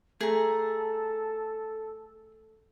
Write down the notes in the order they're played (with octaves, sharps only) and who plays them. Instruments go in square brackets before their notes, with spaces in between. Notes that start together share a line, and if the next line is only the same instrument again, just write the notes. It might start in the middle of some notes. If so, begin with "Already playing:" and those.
[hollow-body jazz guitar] A3 [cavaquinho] G#4 A#5 [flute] A4